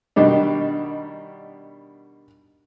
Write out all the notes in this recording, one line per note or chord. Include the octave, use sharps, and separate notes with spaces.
B2 D#3 G3 D4 D#4